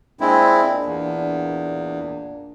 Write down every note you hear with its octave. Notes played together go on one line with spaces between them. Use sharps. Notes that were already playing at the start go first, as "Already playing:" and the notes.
A#2 G#3 A#3 C4 D4 E4
E2